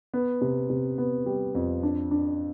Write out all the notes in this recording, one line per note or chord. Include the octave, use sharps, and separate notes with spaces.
B3
C3
C3
B3
G3
F2
D4
D4